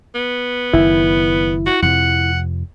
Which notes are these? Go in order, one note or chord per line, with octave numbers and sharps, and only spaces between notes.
B3
F#1 D#3 E4
F#4
F2 C3 F3 F#5